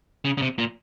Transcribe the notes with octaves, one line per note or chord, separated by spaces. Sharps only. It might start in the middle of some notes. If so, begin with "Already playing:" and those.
C#3
C#3
C3
A#2